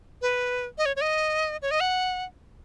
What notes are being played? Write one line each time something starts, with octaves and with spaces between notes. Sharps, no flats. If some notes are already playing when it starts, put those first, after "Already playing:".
B4
D#5
C#5
C#5
D#5
C#5
D#5
F#5